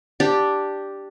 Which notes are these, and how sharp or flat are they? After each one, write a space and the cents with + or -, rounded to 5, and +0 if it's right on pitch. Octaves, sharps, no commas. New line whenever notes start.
D4 +0 G4 +0